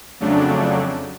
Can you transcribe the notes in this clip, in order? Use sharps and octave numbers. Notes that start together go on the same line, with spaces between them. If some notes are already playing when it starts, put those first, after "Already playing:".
F2 C#3 F#3 A3 D4